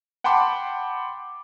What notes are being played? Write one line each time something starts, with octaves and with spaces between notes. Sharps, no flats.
F#5 G5 A5 B5 C6 D6